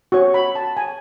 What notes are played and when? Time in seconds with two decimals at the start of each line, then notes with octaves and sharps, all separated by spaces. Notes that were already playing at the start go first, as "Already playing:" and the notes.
0.12 F#4 C#5 C#6
0.34 B5
0.55 A5
0.77 G#5